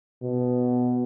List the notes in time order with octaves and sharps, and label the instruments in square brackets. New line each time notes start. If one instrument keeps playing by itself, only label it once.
[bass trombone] B2